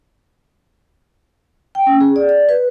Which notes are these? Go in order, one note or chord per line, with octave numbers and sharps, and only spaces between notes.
G5
C#4
G#4
D5
D5
B4